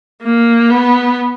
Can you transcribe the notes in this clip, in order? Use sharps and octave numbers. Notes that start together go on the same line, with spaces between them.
A#3
B3